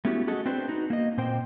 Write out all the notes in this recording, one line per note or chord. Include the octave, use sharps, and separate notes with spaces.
A3 B3 C#4 E4 F#4 G4
F#4 G#4 A4 D#5
C4 D4 B4 C5
D#4 F#4
A#3 D#5
A#2 C4 C5 G5